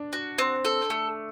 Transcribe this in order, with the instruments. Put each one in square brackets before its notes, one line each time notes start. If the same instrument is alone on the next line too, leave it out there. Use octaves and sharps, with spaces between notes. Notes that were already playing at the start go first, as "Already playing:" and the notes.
Already playing: [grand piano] D4
[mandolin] F#4
C4
A4
A3